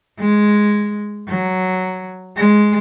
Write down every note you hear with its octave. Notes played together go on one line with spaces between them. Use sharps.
G#3
F#3
G#3